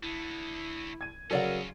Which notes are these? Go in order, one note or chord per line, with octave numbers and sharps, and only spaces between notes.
D3 A3 E4
G#6 D#7
C#3 F#3 C#4 F4 A4 A#4 D5 F#5